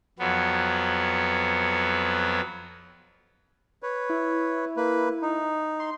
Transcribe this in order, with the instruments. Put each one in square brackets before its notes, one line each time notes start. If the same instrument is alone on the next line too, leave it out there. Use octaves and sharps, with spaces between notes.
[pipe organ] F2 F#3 B3
[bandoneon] B4 C#5
[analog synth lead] E4
[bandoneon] A#3 B4
D#4
[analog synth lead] C6